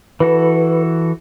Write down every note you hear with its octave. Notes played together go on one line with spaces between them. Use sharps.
E3 F#4 A4 B4